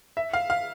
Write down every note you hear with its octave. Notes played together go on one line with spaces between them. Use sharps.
E5
F5
F5